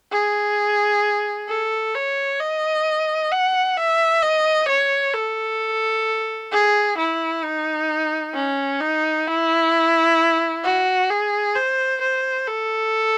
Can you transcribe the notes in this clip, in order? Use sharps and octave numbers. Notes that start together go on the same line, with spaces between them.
G#4
A4
C#5
D#5
F#5
E5
D#5
C#5
A4
G#4
E4
D#4
C#4
D#4
E4
F#4
G#4
C5
C5
A4